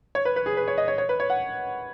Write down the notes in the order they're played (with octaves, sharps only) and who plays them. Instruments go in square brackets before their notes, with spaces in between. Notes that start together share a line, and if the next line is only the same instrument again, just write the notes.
[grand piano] C#5
B4
B4
G#4
B4
C#5
D#5
C#5
C#5
B4
C#5
F#5